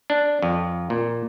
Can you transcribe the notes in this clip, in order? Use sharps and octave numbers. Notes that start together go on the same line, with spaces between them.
D4
F2
A#2